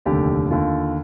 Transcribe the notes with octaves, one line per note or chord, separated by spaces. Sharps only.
F1 D#2 D3 G4
D#2 D3 F4